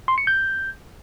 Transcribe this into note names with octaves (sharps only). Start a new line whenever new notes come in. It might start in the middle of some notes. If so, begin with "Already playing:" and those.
C6
C#7
G6